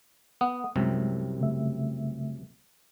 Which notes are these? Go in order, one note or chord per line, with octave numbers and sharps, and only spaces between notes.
B3 F#5 D#6
C2 F#2 C3 G#3
C#3 A3 E5